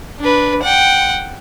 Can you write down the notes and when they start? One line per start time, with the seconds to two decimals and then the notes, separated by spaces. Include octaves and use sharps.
0.19 D4 B4
0.62 F#5 G5